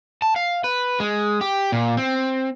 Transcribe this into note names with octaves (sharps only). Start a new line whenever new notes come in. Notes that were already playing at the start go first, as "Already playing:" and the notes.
A5
F5
B4
G#3
G4
A#2
C4